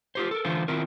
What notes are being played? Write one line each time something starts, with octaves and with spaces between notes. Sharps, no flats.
F4 G4 C5
A4 A#4
D3 E3 A3 F4 C5
D#3 C4 E4 F4 A#4